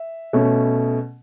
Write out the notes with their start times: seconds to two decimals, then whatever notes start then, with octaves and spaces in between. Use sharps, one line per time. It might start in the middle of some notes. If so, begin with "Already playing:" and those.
Already playing: E5
0.33 B2 A3 C#4